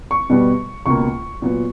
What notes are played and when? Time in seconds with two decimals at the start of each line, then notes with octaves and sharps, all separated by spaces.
0.11 C#6
0.30 B2 G3 B3
0.86 C#2 B2 A#3 C#6
1.42 A#2 F#3 B3